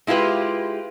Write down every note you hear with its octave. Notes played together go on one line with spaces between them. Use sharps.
G#3 E4 F4 G4 B4